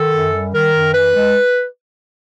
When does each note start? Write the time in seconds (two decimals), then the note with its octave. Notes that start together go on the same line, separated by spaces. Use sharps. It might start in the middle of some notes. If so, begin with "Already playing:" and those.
Already playing: D#3 A4
0.12 F#2
0.33 G3
0.53 D#3 A#4
0.73 F#2
0.93 E3 B4
1.13 G#3